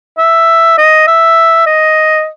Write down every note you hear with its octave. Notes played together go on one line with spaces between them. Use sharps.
E5
D#5
E5
D#5